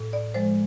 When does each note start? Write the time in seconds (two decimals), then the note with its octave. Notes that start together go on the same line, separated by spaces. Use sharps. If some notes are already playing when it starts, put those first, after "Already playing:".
Already playing: A2
0.13 D5
0.34 F3 G#3 C5